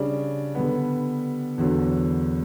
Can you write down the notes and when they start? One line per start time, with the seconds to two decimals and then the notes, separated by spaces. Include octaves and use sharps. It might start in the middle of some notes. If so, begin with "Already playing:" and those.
Already playing: C#3 G3 D4
0.55 D3 G3 B3
1.58 E2 D3 F#3